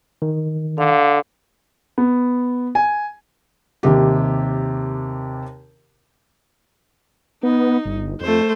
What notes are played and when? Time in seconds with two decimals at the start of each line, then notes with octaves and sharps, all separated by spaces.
0.22 D#3
0.78 D3 F5
1.98 B3
2.75 G#5
3.83 D#2 C3 G4
7.43 B3 D#4
7.85 G1
8.21 F2 A3 C5